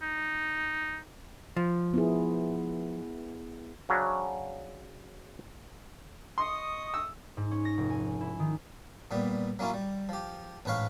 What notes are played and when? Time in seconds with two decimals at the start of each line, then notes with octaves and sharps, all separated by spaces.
0.02 D#4
1.56 F3
1.94 B3 E4 G#4
3.89 C#3 F#3 C#4 D4 F#4 C5
6.38 D#5 C6 C#6 D#6
6.94 E6
7.37 G#2
7.51 C#4
7.65 A#6
7.77 F1
7.90 G#5
8.21 E4
8.40 D#3
9.11 A#2 G3 B3
9.59 F#3 A#3 C#4 E4 F4
9.74 G3
10.09 F3 G4
10.65 A1 G#2 B4 C#5 F5